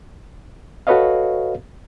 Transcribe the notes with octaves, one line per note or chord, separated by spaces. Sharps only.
F#4 A4 B4 C#5 D#5 F5